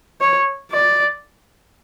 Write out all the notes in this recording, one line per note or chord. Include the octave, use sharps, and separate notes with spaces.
C#5
D5